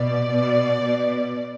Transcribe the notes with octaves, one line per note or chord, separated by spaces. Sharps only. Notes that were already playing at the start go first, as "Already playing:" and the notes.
Already playing: B2 D5
B2
B2